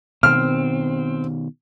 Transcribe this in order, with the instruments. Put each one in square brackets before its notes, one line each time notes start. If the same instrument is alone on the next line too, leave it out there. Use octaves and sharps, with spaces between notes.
[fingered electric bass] B2 D#3 [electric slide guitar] C4 [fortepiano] F6